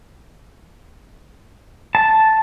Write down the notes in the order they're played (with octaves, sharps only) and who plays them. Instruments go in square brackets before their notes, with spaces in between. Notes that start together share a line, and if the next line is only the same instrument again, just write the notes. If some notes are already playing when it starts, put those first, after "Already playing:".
[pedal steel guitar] A5